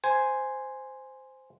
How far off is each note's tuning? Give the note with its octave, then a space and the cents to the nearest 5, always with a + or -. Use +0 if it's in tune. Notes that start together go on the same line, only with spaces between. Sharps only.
C5 -5 G#5 +0